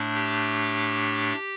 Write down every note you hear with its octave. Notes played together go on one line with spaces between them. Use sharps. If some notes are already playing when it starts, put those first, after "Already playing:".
Already playing: A2 A3 D4
G4